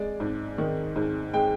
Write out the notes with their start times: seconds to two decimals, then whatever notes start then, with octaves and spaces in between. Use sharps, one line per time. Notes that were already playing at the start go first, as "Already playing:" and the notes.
Already playing: G#3 D5
0.20 G#2
0.58 D#3
0.96 G#2
1.34 G#3 G5